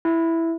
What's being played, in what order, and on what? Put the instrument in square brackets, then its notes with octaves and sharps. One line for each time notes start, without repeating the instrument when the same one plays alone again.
[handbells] E4